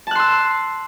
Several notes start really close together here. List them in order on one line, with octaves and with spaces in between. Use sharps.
A5 F#6 C6 E6